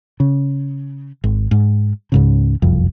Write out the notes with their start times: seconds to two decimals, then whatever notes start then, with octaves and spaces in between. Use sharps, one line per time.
0.20 C#3
1.24 G#1
1.51 G#2
2.12 C#2 G#2 C#3
2.62 F#1 C2 F2